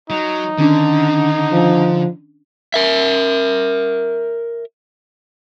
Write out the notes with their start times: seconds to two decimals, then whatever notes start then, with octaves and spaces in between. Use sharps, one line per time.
0.10 F#3 D#4
0.58 D3 D#3 C#4 D4
1.52 F3
2.74 A#4 E5